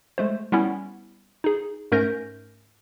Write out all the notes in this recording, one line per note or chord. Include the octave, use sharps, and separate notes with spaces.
G#3 A3 C5
G3 B3 C#4 E4
D#4 G#4
G#2 A3 C#4 A#4 G6 A#6